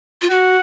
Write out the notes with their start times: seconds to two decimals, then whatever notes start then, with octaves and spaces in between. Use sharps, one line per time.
0.22 F4
0.30 F#4 F#5